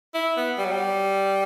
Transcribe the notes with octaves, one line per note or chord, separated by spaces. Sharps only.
E4
B3
G3
F#3
G3